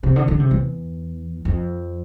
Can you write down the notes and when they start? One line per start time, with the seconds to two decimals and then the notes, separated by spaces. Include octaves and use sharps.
0.03 C3
0.16 D3
0.28 D3
0.40 C3
0.51 E2
1.45 F2